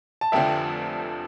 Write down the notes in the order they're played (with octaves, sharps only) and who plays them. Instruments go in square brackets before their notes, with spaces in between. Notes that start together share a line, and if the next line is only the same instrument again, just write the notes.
[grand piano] A5
[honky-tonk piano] F1 F2 D3 F3 [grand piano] E5 G5